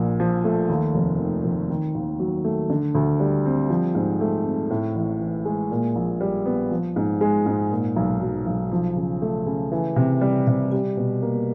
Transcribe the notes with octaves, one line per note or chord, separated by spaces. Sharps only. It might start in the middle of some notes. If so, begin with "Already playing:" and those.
Already playing: A#1 A#2
F3
A3
D#2
F1
D#3
F1
D#3
D#2
F#3
A3
D3
D2
G3
C4
F3
G#2
A3
C4
A2
A1
E3
G#3
A#2
A#1
G3
B3
F3
G#2
G#3
G#2
A#2
B1
F#3
B1
F3
C#3
A3
C#3
E3
C3
G3
C3
G3
B2
A#3